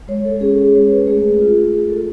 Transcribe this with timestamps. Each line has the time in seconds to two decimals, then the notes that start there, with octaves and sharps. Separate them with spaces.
0.08 G#3 C#5
0.25 A4
0.41 C#4 G#4
0.58 G#4
0.74 G#3 C#5
0.91 B4
1.07 A3 G#4
1.40 F4
1.73 A3 G#4
1.90 A4